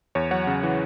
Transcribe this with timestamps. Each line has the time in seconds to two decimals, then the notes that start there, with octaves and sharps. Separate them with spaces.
0.15 E2 C#5
0.31 F#3 C#5 F#5
0.47 C#3
0.63 E3